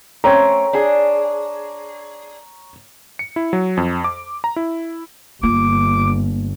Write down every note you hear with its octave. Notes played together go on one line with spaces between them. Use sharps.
A3 C4 C#4 C#5 A#5
D4 G#4
C#7
E4
F#3
F2
D6
A#5
E4
G1 A#3 F4 D6